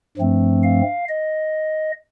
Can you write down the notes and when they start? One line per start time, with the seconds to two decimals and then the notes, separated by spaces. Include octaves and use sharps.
0.18 G2 F3 A3 C4
0.63 F5
1.09 D#5